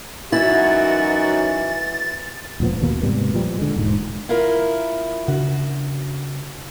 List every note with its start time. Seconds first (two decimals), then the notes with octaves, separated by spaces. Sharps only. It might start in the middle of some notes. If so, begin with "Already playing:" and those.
0.32 F#2 E3 D#4 E4 F#4 A6
2.60 E1 A#2 F3 B3
2.80 A1 D#2 B2 A#3
3.03 G#2 C3 G3 B3
3.34 A#2 F3 G3
3.58 D3 G#3
3.76 E1 G#2
4.29 E4 F4 A#4
5.28 C#3 D4 F#4